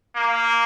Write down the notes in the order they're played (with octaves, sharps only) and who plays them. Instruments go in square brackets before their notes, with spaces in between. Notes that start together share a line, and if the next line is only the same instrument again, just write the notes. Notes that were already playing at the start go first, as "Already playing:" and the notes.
[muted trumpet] A#3